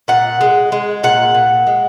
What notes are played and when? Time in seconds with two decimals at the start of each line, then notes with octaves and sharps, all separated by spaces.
0.08 A#2 F#5
0.41 G#3
0.72 G#3
1.03 A#2 F#5
1.34 A#2
1.67 G#3